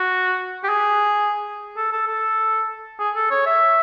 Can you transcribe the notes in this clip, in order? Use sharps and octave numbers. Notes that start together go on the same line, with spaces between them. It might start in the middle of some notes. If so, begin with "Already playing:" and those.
Already playing: F#4
G4
G#4
A4
A4
A4
G#4
A4
C#5
E5